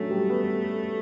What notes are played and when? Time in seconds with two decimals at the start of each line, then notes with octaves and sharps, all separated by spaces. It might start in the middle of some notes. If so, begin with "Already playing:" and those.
Already playing: F#3 A3 C#4 D4
0.10 G3
0.30 B3